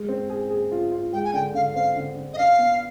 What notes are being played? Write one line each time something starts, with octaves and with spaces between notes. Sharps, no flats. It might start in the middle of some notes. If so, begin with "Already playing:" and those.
Already playing: G#3
C4
G#4
G#4
F4
F4
G#3 G5
G#5
D3 G5
D3 F5
C4 F5
D3
D3
D#5
D4 F5
B3